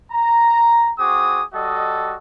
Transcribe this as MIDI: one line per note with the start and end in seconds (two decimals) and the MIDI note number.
0.11 0.91 82
0.98 1.43 60
0.98 1.43 66
0.98 1.43 68
0.98 1.43 86
0.98 1.43 87
1.53 2.16 55
1.53 2.16 66
1.53 2.16 69
1.53 2.16 75